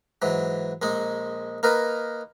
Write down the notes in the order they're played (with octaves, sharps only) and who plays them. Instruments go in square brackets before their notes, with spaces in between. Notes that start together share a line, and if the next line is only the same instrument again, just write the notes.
[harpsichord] G#2 E3 F#3
A#1 G#3 D#4
A#3 D#4 A#4 B4